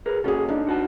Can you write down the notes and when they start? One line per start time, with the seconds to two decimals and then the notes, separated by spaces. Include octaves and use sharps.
0.06 G#4 A#4 B4
0.24 A#2 C#4 F#4 G#4 A4
0.49 D4 D#4
0.67 D3 F#4 A5